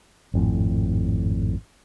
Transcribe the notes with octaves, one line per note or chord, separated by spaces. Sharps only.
G#1 F2 A2